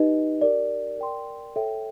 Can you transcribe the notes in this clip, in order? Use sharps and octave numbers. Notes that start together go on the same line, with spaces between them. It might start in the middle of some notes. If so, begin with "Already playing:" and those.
Already playing: D#4 G4 B4 D#5
G4 A#4 D5
A#4 D5 G5 C6
A4 C#5 E5 G5